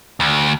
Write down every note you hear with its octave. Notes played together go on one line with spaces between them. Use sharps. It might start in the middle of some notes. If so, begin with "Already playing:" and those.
D2